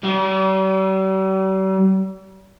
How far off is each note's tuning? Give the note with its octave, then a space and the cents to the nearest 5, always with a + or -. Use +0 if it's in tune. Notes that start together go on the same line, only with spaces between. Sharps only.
G3 -45